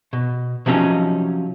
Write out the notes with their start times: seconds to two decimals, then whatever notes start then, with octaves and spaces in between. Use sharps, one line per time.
0.13 B2
0.66 C3 F3 F#3 C#4 D#4